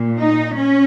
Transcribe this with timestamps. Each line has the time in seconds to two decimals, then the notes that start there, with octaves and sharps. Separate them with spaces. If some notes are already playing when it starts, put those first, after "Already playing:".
Already playing: A#2
0.19 D#4
0.56 C#4